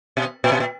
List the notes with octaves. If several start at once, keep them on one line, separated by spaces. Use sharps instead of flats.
B2
A#2
B2
A#2